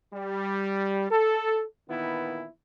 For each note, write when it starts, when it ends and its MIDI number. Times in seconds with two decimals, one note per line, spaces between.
0.13 1.06 55
1.11 1.63 69
1.89 2.47 46
1.89 2.47 51
1.89 2.47 52
1.89 2.47 59
1.89 2.47 64